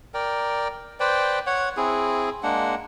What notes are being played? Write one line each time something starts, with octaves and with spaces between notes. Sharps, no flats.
A#4 D5 G5
B4 C5 D5 G5
C#5 F#5
C4 E4 G#4
G#3 A#3 D4 F#5